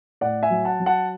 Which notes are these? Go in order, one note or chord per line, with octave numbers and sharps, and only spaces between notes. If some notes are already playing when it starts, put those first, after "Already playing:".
A2 D5 F#5
E5 G#5
F#3
F#5 A5
F#3
F#5 A5